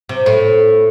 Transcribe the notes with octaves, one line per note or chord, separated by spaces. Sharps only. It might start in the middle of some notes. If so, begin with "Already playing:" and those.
C3
A2